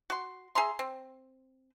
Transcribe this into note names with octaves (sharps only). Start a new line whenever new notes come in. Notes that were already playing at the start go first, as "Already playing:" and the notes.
F#4 C6
G#4 E5 A#5 C6
C4